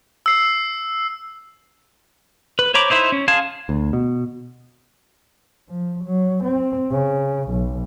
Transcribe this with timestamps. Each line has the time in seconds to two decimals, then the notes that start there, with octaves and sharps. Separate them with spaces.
0.26 E6 C7
2.59 B4
2.74 C5 C#5 A#5 B5 D6
2.90 D#4 E4 C5 E5
3.12 C#4
3.28 G#4 F5 G#5 A5 C6
3.69 D2
3.93 B2
5.69 F3
6.04 F#3
6.44 C4
6.90 C#3
7.50 B1